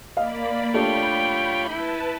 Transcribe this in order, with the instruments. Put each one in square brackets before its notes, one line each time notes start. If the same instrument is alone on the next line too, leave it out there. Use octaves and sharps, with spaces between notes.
[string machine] A#3 D5 B5 [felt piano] D#5 F5
[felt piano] A3 D4 G4 [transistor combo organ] F4 C#5 [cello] G5 [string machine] B5 G6
[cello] E4 [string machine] B4 A5